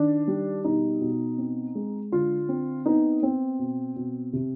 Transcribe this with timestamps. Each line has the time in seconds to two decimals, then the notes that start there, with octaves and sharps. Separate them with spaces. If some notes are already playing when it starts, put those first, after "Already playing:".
Already playing: D#3 D4
0.27 G3
0.64 B2 D#4
1.01 B2
1.38 C4
1.75 G#3
2.12 D3 F4
2.49 C4
2.86 B3 D#4
3.22 B3 C4
3.59 B2
3.96 B2
4.33 C3